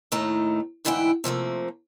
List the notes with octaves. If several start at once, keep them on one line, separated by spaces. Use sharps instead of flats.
D#2 A2 D#3 A3 A#5
D2 G#2 E3 E4 F#5 G5
C3 F3 A3 A#3